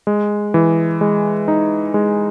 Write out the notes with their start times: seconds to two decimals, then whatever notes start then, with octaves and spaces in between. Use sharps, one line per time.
0.07 G#3
0.54 E3
1.01 G#3
1.48 D#4
1.94 G#3